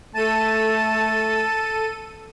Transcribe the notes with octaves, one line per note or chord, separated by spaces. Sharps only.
A3 A4 A5 D#7